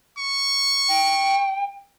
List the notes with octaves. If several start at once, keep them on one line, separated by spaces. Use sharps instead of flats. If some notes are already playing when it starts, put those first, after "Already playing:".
C#6
G5